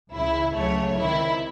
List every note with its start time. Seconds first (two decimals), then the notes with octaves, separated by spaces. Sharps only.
0.15 C#2 C#3 E3 E4
0.55 C#2 C#3 F#3 A3 C#5
0.96 C#2 C3 D#3 E4